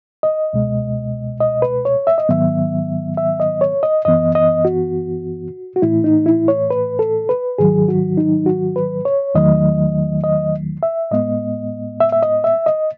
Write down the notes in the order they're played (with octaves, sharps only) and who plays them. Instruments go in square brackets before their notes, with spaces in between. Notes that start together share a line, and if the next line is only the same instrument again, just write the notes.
[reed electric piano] D#5
C#2 B2 G#3
D#5
B4
C#5
E5
D#5
G#2 D#3 F#3 B3 E5
E5
D#5
C#5
D#5
F#2 E3 B3 D#5
D#5
F#4
F#4
A2 E3 A3 E4
D#4
E4
C#5
B4
A4
B4
G#2 D#3 F#3 G#4
F#4
D#4
F#4
B4
C#5
E2 D#3 F#3 A3 D#5
D#5
E5
A2 G#3 B3 D#5
E5
E5
D#5
E5
D#5